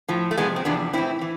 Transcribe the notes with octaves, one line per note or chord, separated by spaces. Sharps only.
A2 F3
A3
E2 C3 F3 G#3 B3
C4
E2 C3 F3 B3 D4
A2 E3 C4 E4
E3